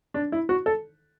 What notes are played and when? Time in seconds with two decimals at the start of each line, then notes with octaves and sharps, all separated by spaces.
0.14 D4
0.32 E4
0.49 F#4
0.66 A4